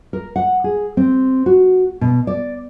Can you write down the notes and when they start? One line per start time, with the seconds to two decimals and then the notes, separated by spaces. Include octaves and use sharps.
0.13 A#4
0.36 F#5
0.64 G#4
0.97 C4
1.46 F#4
2.01 B2
2.27 D5